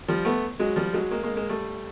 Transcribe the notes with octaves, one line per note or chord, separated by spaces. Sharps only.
F3 G3
A3 B3
F#3 G#3
F3 G3
F#3 G#3
G#3 A#3
G#3 A#3
G#3 A#3
G3 A3